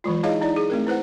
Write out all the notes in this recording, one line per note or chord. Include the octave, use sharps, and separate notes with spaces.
E3 F#3 G#3 F4
D#4 E4 G#4 C#5 D#5 F5
D#4 E4 D5
G#4
A3 C4 A#4
E4 B4 C5 F#5